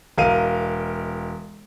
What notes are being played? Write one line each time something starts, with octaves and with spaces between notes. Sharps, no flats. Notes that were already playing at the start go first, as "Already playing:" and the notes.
E1 A#4 F5 D#7